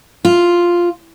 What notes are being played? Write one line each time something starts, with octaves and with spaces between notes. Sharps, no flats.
F4